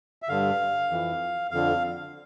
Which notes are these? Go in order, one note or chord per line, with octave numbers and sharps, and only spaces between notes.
E5
G2 D3 F5
F2 E3
F2 D3 F5